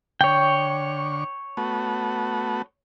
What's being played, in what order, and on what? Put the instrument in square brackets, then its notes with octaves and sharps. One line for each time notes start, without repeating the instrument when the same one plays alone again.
[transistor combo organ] D3 C#6 [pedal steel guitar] C#5 G5
[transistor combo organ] A3 B3 F#4